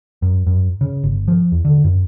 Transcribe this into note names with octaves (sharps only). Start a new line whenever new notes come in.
F#2
F#2
C#3
G1
F3
E2
D3
F#2